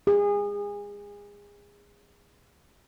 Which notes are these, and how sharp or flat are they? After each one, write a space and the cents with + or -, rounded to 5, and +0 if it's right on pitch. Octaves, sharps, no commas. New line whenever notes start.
G#4 -30